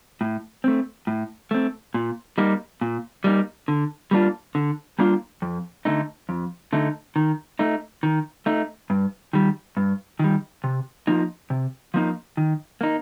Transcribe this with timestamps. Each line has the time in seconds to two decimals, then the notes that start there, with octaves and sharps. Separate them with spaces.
0.21 A2
0.64 A3 C4
1.07 A2
1.51 A3 C4
1.94 A#2
2.38 G3 A#3 D#4
2.81 A#2
3.24 G3 A#3 D#4
3.68 D3
4.11 G3 A#3 D4 F4
4.55 D3
4.99 G3 A#3 D4 F4
5.42 F2
5.85 D3 A3 D#4
6.29 F2
6.73 D3 A3 D#4
7.16 D#3
7.59 A3 D#4
8.03 D#3
8.46 A3 D#4
8.90 G2
9.33 D#3 G3
9.77 G2
10.19 D#3 G3
10.64 C3
11.07 F3 A#3 D#4
11.50 C3
11.94 F3 A#3 D#4
12.37 D#3
12.81 A#3 D#4